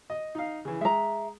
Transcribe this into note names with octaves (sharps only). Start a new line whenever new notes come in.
D#5
D#4 F5
C#3 E3
G#3 E5 A#5